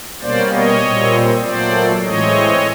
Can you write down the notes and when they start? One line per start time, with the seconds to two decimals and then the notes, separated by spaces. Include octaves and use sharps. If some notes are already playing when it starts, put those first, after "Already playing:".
0.21 B2 G3 A#3 C#4 C5 D5
0.52 C#5 D#5
0.82 A#2 G3 C4
1.43 A#2 F#3 A3 C5 D5
2.03 A2 E3 G#3 C4 C#5 D#5